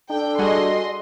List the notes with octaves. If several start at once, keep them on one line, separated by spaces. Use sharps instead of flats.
D4 A4 G5
G3 F#4 G#4 D#5 C6